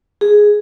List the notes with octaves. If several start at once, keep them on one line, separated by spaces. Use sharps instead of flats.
G#4